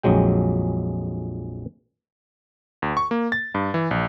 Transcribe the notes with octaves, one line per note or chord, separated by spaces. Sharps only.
A#1 F2 F#3 G#3 G5
D2
C#6
A#3
A6
G2
E3
A#1